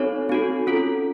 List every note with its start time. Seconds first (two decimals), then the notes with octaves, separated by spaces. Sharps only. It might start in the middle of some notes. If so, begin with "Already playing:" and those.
Already playing: C4 D#4 F#4 A4 C#5
0.29 C4 D#4 F#4 A4
0.67 C#4 F4 A4